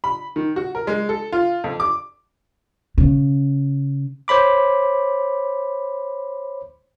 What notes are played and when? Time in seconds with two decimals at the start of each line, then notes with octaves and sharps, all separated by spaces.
0.04 B5
0.36 D#3
0.56 F#4
0.75 A#4
0.87 G#3
1.09 A4
1.33 F4
1.64 F2
1.80 D6
2.98 C#3
4.28 C5 C#5 B5 D6